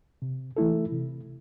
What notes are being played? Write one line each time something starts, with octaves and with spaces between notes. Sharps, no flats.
C3
E3 A3 E4 A4
C3